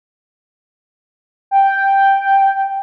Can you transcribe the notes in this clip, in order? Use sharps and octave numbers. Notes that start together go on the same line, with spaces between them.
G5